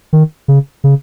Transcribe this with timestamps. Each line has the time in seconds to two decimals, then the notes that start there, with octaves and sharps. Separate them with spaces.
0.13 D#3
0.48 C#3
0.84 C#3